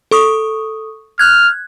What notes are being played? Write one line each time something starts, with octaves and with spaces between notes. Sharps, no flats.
A4 C#6 D#6
F6 F#6 G#6